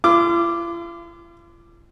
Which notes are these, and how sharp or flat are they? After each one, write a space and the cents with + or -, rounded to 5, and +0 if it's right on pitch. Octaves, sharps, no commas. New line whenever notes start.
F4 -45 D6 +0